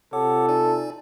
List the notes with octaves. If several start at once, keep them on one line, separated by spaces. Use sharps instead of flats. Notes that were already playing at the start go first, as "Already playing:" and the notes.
C3 F4 A4 C#5 F#5 D6
D#4 D5 G#5